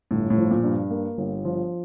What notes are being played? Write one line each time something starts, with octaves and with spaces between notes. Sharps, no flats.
G1 A2
A2
F3
A#2
G2
A#3
G1
F3